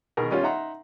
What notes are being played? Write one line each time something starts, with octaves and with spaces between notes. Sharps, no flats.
B2 D#3 G#4 A#4
G3 C#4 F4 C#5
D#4 E5 F#5 A#5 C6